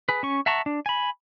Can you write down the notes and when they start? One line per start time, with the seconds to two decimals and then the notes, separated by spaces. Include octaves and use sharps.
0.09 G#4 B4
0.23 C#4 C#6
0.46 E5 F#5 A5 A#5 C#6
0.66 D4
0.86 G#5 B5